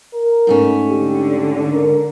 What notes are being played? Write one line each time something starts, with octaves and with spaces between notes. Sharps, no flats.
A#4
G#2 A3 C#4
D3 G4
A#4